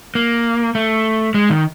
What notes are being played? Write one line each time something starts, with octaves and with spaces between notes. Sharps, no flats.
A#3
A3
G#3
D#3